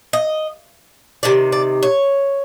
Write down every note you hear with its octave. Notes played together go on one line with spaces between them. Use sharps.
D#5
C3 D#3 D5
D5
C#5